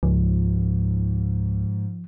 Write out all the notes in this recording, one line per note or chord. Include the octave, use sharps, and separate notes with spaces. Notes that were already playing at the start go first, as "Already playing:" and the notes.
C#2 G#2 F3